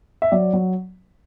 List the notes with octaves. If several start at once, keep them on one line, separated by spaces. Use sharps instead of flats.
E5
F#3 D5
F#3